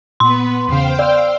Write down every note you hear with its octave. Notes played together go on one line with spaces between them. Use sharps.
A#2 B3 B4 C6
E2 C#3 C5 F5 G5
D5 E6